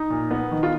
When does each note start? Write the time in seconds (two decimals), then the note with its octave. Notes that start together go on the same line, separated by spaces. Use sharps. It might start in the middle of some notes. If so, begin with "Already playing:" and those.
Already playing: D#4
0.10 A#2
0.31 B3
0.51 D#3
0.63 F4